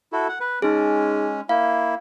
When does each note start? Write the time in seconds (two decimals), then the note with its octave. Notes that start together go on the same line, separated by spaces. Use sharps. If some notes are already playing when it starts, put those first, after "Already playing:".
0.13 E4 F#4 A4
0.29 F#5
0.40 B4
0.62 G#3 C#4 D#4 G#4
1.49 A#3 E4 F5